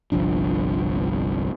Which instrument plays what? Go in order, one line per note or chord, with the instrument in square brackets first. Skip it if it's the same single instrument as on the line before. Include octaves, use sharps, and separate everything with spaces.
[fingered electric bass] G1 C2 F3 D4